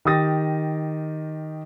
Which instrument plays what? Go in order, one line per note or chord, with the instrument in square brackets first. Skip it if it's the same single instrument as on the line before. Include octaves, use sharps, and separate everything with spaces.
[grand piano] D#3 G4 D#6 A6 A#6